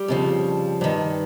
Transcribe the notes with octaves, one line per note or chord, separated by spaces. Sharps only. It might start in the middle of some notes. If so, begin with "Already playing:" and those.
Already playing: G3
F2 C#3 F3
G2 D#3